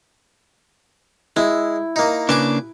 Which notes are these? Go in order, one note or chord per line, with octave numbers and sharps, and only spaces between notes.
G#3 E4
A#3 D#4
C#3 A#3 D4 B4 G#5 D6